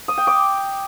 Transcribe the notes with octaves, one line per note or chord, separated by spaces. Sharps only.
D#6
G5
D6